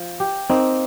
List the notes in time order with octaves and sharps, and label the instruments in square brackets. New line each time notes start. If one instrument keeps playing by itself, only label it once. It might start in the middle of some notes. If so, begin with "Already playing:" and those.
Already playing: [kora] F3
G4
[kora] A#3 [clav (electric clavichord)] C4 D#4